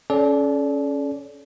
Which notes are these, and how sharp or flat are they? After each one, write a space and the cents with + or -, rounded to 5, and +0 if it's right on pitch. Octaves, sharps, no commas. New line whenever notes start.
C#4 +0 A4 -35 D5 -15